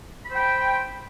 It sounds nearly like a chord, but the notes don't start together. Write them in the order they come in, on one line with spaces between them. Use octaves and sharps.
B5 C5 G5